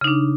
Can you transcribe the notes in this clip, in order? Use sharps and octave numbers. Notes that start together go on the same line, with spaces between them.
C#3 D4 D#4